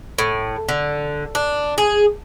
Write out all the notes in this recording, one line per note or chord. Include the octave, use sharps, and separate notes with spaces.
A2
D3
D4
G#4